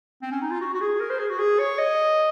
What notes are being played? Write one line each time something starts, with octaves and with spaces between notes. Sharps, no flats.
C4
C#4
D#4
F4
F#4
F#4
G#4
A#4
C5
G#4
F#4
G#4
C#5
D#5